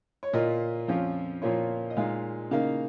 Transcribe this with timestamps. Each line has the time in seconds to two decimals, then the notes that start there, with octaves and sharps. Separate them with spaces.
0.23 C#5
0.33 A#2 A#3 F4 D#5
0.88 F2 F3 C#4 F4
1.42 A#2 F3 A#3 F4 C#5
1.90 D#5
1.97 A#2 G#3 D#4 F5
2.51 C#3 A#3 D#4 F5